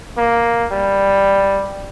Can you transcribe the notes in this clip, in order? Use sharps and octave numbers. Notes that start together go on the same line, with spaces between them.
A#3
G3